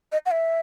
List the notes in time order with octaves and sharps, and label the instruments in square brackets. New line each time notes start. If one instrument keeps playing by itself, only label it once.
[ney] D#5
F#5
E5